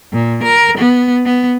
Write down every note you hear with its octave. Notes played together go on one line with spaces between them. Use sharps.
A#2
A#4
B3
B3